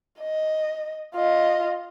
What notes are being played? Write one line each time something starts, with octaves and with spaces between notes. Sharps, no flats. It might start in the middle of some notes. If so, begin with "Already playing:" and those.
D#5
F4 D#5